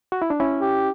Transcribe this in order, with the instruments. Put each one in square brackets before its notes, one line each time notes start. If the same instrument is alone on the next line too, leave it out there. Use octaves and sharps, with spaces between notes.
[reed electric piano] F#4
E4
D4
C#4 E4
[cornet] G4